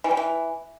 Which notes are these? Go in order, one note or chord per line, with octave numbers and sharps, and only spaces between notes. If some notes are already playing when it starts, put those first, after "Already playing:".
E3
G3
E3